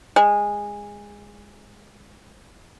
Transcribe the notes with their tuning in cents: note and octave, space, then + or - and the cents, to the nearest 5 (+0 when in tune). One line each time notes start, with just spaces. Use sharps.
G#3 -15